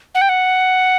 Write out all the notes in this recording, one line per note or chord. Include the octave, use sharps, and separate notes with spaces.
F#5
G5
F#5